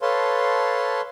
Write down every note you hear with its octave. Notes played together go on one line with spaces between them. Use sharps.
A4 B4 C#5 F5 A5 C6